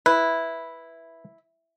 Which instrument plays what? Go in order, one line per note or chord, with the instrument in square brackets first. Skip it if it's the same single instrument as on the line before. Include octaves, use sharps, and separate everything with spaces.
[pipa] E4 [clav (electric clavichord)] B4